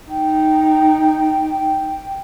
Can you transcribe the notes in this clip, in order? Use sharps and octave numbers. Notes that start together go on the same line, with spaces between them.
D#4 G5